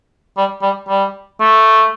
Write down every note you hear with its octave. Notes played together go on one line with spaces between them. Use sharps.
G3
G3
G3
A3